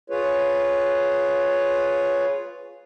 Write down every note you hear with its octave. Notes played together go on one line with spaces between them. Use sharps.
F4 G#4 B4 C#5